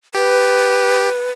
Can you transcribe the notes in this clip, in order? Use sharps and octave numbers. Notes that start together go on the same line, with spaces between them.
G4 B4